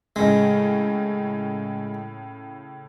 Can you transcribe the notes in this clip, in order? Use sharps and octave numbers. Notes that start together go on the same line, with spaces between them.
A2 C#3 G#3